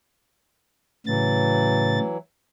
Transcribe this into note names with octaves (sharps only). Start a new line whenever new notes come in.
A2 C#3 E3 F#3 A6